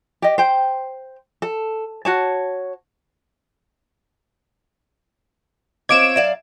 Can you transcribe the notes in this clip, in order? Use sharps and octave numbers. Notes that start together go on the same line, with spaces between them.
G4 D#5
C5 G5
A4
F#4 C#5 A5
C4 F4 C#5 D#5 D6 G#6 D7 E7
F#2 D5 E5 F5